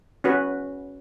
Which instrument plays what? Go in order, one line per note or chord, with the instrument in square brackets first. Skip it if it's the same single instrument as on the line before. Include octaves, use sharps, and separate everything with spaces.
[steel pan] C#4 F#4 B4